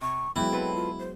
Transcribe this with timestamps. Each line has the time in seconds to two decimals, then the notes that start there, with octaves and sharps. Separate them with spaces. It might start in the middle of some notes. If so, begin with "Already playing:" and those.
0.01 C3 C#6
0.36 E3 F#3 G#3 B3 E4 G5
0.52 C4 A4 B4
0.75 F4
0.99 C5